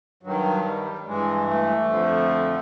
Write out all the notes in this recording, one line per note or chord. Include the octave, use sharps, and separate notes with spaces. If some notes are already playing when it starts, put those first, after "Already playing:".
G2 D#3 F#3
G3
G2 E3 G#3
A3
F2 D3 F3